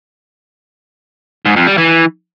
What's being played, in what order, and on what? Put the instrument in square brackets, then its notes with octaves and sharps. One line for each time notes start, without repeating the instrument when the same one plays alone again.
[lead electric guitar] G#2
F2
G3
E3